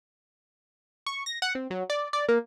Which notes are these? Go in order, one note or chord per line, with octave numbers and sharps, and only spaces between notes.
C#6
A#6
F#5
C4
F#3
D5
D5
A#3